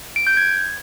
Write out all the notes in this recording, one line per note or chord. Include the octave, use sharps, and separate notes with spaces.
D7
G6
G#6